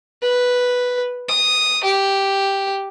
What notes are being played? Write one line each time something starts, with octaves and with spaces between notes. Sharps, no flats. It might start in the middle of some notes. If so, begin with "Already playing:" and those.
B4
D#6
G4